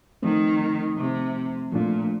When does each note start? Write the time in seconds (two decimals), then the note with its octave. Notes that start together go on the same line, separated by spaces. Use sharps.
0.23 D#3 F3 A3 C4
0.98 C3
1.72 A#2 F3 A3 D4 F4